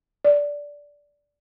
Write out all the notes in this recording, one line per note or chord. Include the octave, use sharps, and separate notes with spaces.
D5